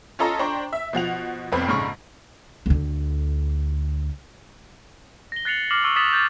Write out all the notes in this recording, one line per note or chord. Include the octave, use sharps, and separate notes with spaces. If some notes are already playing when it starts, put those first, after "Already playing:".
C#4 F4 A4 D#5 A#5
D4 C5 G5 A#5 C#6
E5
B2 F3 F#5 F7
F1 C2 F2 B3 C4 B5
A#1 G#2 C#3 B5 C#6
D2 D3
A#6 G7
F#6 A6 C7 C#7 F7 F#7
D6 F6 A#6 C7 F#7
C#6 E6 G7
D#6 A6 B6 E7 F#7
G6 A6